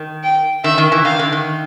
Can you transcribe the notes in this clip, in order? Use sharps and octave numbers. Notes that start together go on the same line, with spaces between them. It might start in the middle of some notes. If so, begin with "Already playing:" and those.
Already playing: D#3
G5
D#3 E5
D#3
E3
D#3 F5
D3
D#3